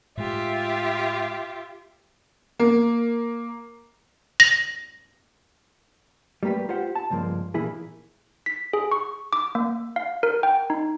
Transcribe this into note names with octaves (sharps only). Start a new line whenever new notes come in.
A2 G#3 F4 G4 E5
A#3
A#6
G3 A3 A#3 G4 B4
F4 G4 C5 F#5
A5
C#2 G2 F3 G#3 A#3
A#2 E3 A#3 E4 G#4
B6
G#4
C#6
D6
A#3
F5
A#4
G5
D#4